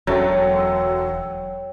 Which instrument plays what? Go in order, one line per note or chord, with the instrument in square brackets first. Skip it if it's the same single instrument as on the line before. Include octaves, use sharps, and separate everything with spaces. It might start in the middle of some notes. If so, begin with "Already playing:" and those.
[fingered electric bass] E1 [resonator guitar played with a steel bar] F#2 [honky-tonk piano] F#3 A4 [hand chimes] C#5 G5